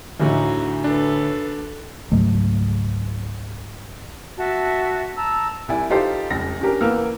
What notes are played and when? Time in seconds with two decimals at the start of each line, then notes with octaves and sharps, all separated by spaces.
0.20 D2 A2 D3 D#4 F#4
0.84 D4 A4 B4
2.12 C#2 G#2 F#3 A3
4.38 F#4 E5 A5
5.17 A5 A#5 E6
5.68 C2 E4 D5 G#5
5.90 D#4 F4 G4 A4 C5
6.30 F1 C#2 A#6
6.60 C#4 D4 G4 A#4
6.81 E2 A#3 B3 E6 F6